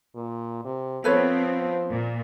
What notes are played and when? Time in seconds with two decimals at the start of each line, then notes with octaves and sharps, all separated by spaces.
0.15 A#2
0.65 C3
1.04 F3 B3 C4 A4 B4 C#5
1.90 A#2